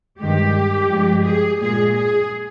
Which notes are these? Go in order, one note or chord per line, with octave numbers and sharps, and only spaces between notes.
G2 D#3 G#3 G4
G2 F3 G#3
G#4
A#2 G#3 G#4
G#4